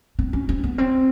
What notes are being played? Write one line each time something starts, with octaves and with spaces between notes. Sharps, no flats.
C4
C#4
C4
B3
C4